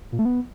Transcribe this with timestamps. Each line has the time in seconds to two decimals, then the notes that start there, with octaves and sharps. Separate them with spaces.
0.12 A#2
0.19 A3
0.25 B3